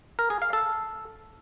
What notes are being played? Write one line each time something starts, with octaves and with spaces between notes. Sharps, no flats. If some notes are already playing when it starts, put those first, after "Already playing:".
A#4
G#4
F5
A4